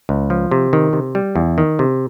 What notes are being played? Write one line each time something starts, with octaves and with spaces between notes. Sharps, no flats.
C#2
F3
C3
D#3
C3
G3
E2
D#3
C3